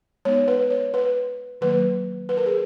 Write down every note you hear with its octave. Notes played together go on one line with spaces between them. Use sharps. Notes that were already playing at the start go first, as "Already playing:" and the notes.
G#3 B3 D#4 C#5
B4
C#5
B4
D#3 F#3 A#3 B4
B4
A#4
G#4